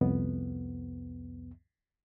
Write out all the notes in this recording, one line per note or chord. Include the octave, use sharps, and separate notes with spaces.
C2 F2 B3